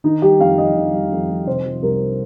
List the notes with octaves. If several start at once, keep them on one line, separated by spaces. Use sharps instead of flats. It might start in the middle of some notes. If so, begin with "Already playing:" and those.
D#3 D#4
G3 G4
F2 F5
F2 D#5
D#3
G3
F2
F2
C3 C5
F3
C2 A#4